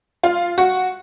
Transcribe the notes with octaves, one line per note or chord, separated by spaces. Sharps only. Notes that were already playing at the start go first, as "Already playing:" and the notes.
F4
F#4